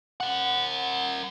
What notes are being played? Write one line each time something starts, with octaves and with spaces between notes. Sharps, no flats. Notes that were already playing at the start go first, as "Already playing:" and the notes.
A#4 F#5